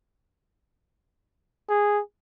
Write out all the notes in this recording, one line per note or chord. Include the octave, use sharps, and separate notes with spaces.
G#4